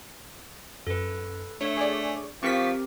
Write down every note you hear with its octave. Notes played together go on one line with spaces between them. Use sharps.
F#2 A4 B4
A3 D4 C#5 E5
G#4 C#5 D5
F3 C4 G4 A#4 C#6 B6